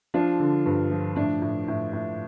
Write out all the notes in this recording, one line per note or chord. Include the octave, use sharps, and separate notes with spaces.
F3 D4 F4
D3
G2
F3
A2 D4
A2
A2
A2